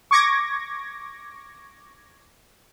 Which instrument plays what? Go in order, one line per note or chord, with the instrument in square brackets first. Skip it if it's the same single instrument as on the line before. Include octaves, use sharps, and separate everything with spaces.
[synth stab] C#6 D6 G#6 A#6